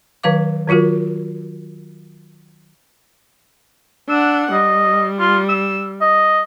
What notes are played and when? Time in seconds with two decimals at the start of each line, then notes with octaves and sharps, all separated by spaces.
0.23 D#3 F#3 B4 F5 D6
0.68 D#3 F#3 F4 F#4 A#4
4.09 D4 F#5 E6
4.52 G3 D#5
5.19 F4
5.49 E6
6.01 D#5